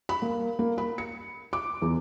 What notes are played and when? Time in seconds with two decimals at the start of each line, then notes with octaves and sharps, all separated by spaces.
0.09 B5
0.22 A#3
0.59 A#3
0.78 B5
0.98 C#7
1.53 D6
1.82 E2